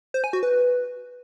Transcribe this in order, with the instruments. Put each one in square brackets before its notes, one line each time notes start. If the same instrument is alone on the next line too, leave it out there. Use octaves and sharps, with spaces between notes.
[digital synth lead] C5
G#5
F#4
B4